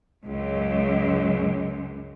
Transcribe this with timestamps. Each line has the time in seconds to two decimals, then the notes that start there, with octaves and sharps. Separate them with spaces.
0.24 C#2 F#2